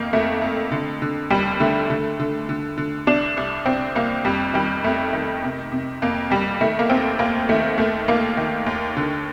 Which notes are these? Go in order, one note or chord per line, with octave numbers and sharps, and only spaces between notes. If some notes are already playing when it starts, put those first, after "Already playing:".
Already playing: F2 D#3 A#3
F2 A3
F2
D3
D3
D#2 G3
D3 A3
D3
D3
D3
D3
C2 D4
C2
C2 C4
C2 A#3
F2 G3
D#3 G3
F2 A3
D#3
C3
C3
F2 A#3
F2 G3
D#3 A3
A#3
D#2 C4
D#2 A#3
D#3 A3
D#2 A3
D#2 A#3
D#3
D#2
D3